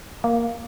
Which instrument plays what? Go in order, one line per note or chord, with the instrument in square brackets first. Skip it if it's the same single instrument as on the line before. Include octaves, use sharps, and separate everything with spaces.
[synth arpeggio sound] A#3